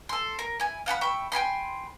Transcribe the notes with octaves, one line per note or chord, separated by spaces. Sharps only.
A4 C6
A#4
E4 G#5
F5 F#5 G#5 B5
E5 G5 B5 C#6
G5 G#5 B5 C6